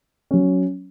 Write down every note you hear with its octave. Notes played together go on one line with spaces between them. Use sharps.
F#3 C#4